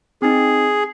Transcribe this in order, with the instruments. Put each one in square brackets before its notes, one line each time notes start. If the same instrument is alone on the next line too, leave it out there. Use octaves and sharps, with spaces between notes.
[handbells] C4 D#4 [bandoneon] G#4